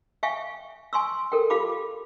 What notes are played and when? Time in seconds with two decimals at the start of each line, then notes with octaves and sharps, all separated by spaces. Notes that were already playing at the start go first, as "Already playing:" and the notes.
0.23 E5 F5 G5 G#5 C#6
0.93 G#5 C6 C#6 E6
1.32 A4 A#4 G5
1.50 F4 G4 F5 B5 D6